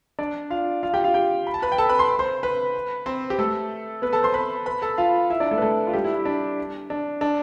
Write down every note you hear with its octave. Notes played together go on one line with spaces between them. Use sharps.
D4 D5
F4 F5
F4 F5
G4 G5
F4 F5
G4 G5
B5
A5
B4 B5
G5
A4 A5
B4 B5
C6
C5 C6
B4 B5
C4 C5
G4
A3 A4
B3 B4
A4 A5
C5 C6
B4 B5
B4 B5
A4 A5
F4 F5
E4 E5
D4 D5
A3 A4
B4
A3 A4
F4
G3 G4
E4
E4
D4
D4
D4